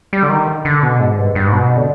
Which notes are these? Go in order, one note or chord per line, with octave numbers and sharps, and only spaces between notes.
G3
D3
D#3
D3
B2
G#2
G2
G2
G#2
B2
D3